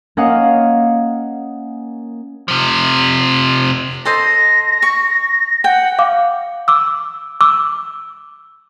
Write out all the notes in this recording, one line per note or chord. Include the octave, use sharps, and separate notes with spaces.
A#3 C#4 D#5 F5 F#5
C3 F3
A4 C5 D#5 A#6
C#6
F#5 G5
F5 D6
D6 E6
D6 E6